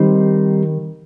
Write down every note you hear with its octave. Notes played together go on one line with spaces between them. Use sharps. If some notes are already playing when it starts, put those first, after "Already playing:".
Already playing: D#3 G3 C4 D#4